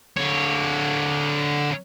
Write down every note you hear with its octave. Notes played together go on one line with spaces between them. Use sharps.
D3 C#5